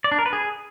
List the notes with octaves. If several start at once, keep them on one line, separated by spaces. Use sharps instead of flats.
D5
D4
A#4
B4
G#4